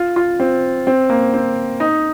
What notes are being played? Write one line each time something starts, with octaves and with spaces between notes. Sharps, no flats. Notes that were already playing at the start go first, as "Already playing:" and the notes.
Already playing: F4
F4
C4
C4
A#3
C4
D#4